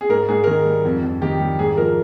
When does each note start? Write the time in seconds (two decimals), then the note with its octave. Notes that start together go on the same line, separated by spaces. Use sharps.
0.01 G#4
0.09 G#2 A#4
0.28 G#2 G#4
0.44 A#4
0.47 D#3 G#4
0.65 G3
0.85 F2
1.03 F2
1.21 D#3 G4
1.41 G3
1.59 G#2 G#4
1.77 F3 A#4